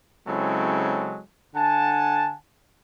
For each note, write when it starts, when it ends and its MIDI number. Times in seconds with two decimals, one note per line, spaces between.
0.28 1.21 49
0.28 1.21 54
0.28 1.21 56
0.28 1.21 60
0.28 1.21 64
0.28 1.21 69
1.55 2.35 50
1.55 2.35 78
1.55 2.35 80
1.55 2.35 81